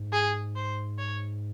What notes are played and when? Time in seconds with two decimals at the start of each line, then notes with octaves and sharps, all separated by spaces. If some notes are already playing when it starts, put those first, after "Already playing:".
Already playing: G#2
0.13 G#4
0.56 C5
0.98 C#5